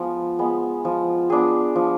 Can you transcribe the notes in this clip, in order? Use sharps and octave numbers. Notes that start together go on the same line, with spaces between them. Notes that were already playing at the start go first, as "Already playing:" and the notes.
Already playing: F3 G#3 B3
G#3 B3
F3
B3 D4 G#4
F3